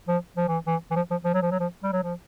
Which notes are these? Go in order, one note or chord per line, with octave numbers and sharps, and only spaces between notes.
F3
F3
E3
E3
E3
F3
F3
F3
F#3
F3
F#3
F3
G3
F#3
F3